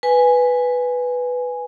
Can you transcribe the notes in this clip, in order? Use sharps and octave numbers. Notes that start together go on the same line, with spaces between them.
B4 G#5